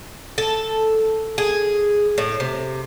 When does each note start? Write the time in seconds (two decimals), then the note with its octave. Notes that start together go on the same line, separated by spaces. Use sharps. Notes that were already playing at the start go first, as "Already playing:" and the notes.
0.38 A4
1.38 G#4
2.18 A2
2.40 C3